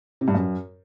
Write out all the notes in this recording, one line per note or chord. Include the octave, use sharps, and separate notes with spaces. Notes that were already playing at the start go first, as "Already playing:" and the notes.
C3
G2
F#2